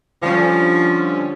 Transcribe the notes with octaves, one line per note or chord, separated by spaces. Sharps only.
D3 F3 G3 C#4